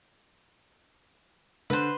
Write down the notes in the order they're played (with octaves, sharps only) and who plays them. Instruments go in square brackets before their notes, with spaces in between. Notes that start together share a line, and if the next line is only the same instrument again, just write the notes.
[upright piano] D3 [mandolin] B4 C5